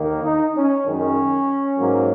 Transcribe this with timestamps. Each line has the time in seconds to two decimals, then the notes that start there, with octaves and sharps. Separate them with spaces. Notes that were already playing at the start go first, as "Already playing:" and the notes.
Already playing: D#2 D#3 A#3
0.24 D#4
0.55 C#4
0.86 F#2 D#3 G#3 C#4
1.77 G#2 F#3 A#3